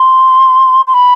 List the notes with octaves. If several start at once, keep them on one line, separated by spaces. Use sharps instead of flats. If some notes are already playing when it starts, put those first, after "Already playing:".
Already playing: C6
C6
B5